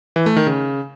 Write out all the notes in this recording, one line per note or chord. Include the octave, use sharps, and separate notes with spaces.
E3
A3
D#3
C#3